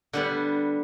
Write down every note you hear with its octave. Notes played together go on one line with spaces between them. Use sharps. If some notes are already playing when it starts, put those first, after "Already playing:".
D3 G3 B3 F#5